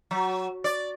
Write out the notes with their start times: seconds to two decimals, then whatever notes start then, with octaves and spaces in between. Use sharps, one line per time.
0.11 F#3
0.64 D5